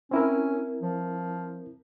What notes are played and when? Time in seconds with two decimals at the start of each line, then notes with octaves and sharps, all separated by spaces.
0.11 C4 C#4 E4 A#4
0.82 F3